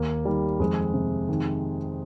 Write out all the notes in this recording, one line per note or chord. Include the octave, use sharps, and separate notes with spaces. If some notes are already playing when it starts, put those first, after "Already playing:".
Already playing: D#2 A#3
D#3 G3
F2 G#3
C3
D#3